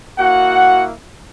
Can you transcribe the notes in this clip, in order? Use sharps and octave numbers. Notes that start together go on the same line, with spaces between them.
A#3 E4 F#4 F#5